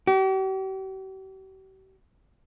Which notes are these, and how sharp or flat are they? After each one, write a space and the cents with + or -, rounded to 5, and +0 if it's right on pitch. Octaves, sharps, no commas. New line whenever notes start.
G4 -45